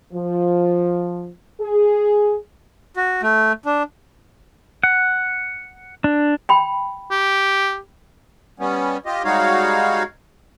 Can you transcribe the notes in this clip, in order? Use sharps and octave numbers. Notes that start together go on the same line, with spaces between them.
F3
G#4
F#4
A3
D4
F#5
D4
G5 B5
G4
G3 B3 C#4
F4 G4 D#5
G3 G#3 D#4 F#4 C#5 F5